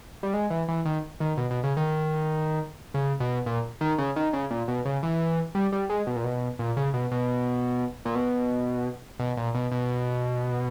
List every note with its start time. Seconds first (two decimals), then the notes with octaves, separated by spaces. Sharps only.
0.23 G3
0.34 G#3
0.50 E3
0.68 E3
0.85 D#3
1.20 D#3
1.37 B2
1.51 B2
1.64 C#3
1.77 D#3
2.94 C#3
3.20 B2
3.46 A#2
3.81 D#3
3.98 C#3
4.16 D#3
4.33 C#3
4.51 A#2
4.68 B2
4.85 C#3
5.03 E3
5.55 G3
5.72 G3
5.90 G#3
6.07 B2
6.16 A#2
6.24 B2
6.59 A#2
6.77 C#3
6.94 B2
7.11 B2
8.05 A#2
8.15 B2
9.19 B2
9.37 A#2
9.55 B2
9.72 B2